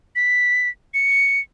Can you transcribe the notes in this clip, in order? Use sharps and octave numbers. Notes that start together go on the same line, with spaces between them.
B6
C#7